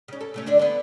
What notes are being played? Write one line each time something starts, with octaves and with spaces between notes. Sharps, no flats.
C#3 C#4
A4
C3 A3 C#4
D3 D4 D5
D3 B3